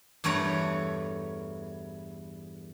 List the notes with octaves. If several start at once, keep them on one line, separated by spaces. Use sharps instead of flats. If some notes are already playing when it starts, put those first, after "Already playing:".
E2 G2 A3 C#5 A#5